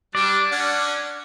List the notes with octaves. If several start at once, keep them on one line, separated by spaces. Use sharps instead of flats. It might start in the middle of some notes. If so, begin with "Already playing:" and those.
G3 D4 D5
C#4 D4 F#5